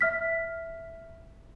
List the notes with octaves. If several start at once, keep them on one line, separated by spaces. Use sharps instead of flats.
E5 F6 B6